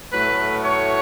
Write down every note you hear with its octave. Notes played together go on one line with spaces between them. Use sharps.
A2 F#3 A3 B4
C#5